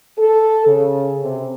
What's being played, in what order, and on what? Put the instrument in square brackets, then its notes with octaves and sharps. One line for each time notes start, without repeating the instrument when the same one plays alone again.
[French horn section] A4
C#3
C3